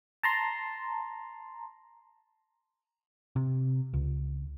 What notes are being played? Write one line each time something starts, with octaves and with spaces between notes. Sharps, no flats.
A5 A#5 C6
C3
C#2